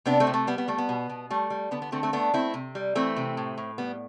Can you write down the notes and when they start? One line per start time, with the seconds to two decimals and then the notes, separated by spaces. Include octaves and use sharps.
0.06 C3 B3 D4
0.20 A3 C4
0.27 C3
0.34 A3
0.47 G3 B3
0.58 B3
0.68 G3 A3
0.78 B3
0.89 B2
1.09 B2
1.30 G3 A3
1.50 G3
1.71 D3 B3
1.82 B3
1.92 D3 A3 C4
2.03 A3 C4
2.13 A3 B3 D4
2.33 A3 C4 E4
2.54 C3
2.75 G3
2.95 E3 A3 C4
3.16 C3
3.37 A2
3.58 A2
3.78 G3 B3